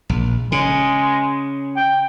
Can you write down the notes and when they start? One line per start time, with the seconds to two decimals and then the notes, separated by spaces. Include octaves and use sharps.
0.09 A#1
0.52 C#3 G#3
1.76 G5